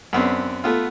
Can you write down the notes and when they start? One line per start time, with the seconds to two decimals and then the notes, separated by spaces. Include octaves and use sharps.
0.13 F#2 B3 C4 D4
0.64 A3 B3 F4